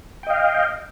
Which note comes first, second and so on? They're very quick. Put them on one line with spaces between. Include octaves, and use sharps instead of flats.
G5 D#5 F5